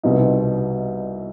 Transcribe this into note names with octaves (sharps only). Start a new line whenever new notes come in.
C2 B2 G3 C4 D#4